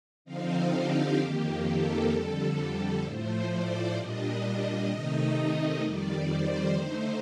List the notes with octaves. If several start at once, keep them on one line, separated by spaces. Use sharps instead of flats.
D3 F3 C4 D#4 F5
G4
F2 D#3 A#3
A4
F2 D3 G3
A2 F3 A3 C5
D5
A#2 G3 D4 D#5
C3 D#3 A3 D#4
F2 D#3 G3 D5
C5
D3 A3 D#4 C5